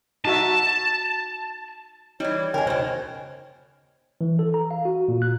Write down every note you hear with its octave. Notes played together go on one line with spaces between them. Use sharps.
D#4 F#4 E5 A5
E3 G3 D#4 C#5
C#3 G#3 A#4 G5 G#5
B2 D#3 C5
E3
A4
A#5
F5
F#4
A#2
F#6